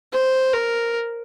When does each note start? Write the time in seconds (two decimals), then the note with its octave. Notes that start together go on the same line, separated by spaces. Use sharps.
0.13 C5
0.53 A#4